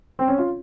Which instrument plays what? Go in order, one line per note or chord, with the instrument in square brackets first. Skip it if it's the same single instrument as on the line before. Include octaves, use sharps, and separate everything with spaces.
[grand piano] C4
C#4
F4